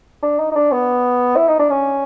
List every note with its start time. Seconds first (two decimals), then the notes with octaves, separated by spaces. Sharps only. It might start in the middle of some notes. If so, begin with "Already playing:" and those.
0.23 D4
0.39 D#4
0.52 D#4
0.56 D4
0.72 B3
1.36 E4
1.48 D#4
1.59 D4
1.70 C#4